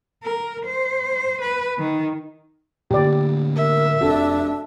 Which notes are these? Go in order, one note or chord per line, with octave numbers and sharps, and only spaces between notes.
A#4
C5
B4
D#3
A2 D3 A#3 G4 D5
A#4 E5
F1 C3 D4 F#4 A4